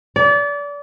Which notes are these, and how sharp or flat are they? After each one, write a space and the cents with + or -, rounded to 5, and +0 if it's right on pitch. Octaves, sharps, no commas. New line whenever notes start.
D5 -30